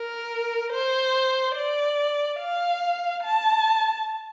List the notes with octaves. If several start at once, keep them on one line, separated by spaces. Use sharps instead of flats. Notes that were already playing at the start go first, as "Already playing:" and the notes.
Already playing: A#4
C5
D5
F5
A5